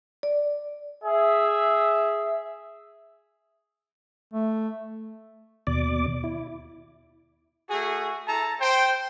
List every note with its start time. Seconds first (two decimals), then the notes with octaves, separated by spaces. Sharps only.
0.23 D5
1.05 G#4 E5
4.34 A3
5.67 D#2 B2 D5 D6
6.24 E4
7.70 A3 F#4 G#4
8.27 E4 A4 A5 A#5
8.61 C5 G5